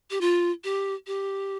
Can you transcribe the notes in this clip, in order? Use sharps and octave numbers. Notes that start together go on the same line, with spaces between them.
G4
F4
G4
G4